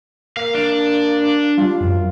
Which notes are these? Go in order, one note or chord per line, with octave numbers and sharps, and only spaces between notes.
A#3 F5
D4
G3 F4
F#2